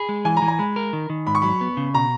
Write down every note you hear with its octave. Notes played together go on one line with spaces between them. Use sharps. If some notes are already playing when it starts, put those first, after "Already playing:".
Already playing: G#4 B5
G#3
E3 G#5
A#5
E3
A#5
G#3 B5
A#4
D#3
D#3
G#2 B5
C#6
F#3 B5
B3
C#3
B2 A#5